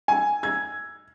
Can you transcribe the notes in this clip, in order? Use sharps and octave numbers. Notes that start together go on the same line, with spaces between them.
G#5
G#6